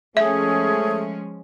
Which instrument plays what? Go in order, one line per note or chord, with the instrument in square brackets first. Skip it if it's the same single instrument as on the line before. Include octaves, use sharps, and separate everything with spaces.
[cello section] F3 G#3 C#4 [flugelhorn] A3 [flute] G#4 [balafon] E5